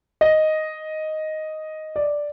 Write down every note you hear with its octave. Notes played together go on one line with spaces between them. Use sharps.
D#5
D5